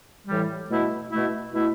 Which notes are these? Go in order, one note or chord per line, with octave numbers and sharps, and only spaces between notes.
A2 E3 G3
B2 A3 E4
B2 A3 E4
B2 A3 E4